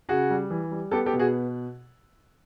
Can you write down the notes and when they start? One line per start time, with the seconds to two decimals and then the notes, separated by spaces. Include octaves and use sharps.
0.09 C#3 F#4 G#4
0.30 G3
0.50 E3
0.71 G3
0.91 B3 G4 A4
1.06 G4 A4
1.13 B2
1.19 F#4 G#4